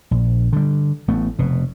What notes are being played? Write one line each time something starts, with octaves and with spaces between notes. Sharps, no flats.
A#1
D3 G3
A1 A3 B3
F1 B2